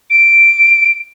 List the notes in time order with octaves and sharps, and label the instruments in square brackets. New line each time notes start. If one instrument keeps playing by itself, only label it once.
[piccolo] D7